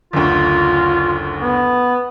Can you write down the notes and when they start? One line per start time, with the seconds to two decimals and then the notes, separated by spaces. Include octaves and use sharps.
0.13 F#1 D2 F4
1.41 B3